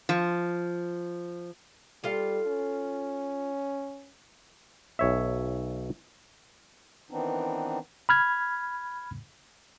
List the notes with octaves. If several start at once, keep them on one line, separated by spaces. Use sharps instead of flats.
F3
G3 F4 A4 F5
C#4
B1 C#5 E5
D#3 E3 B3 C4 D4 D#4
B5 F6 G#6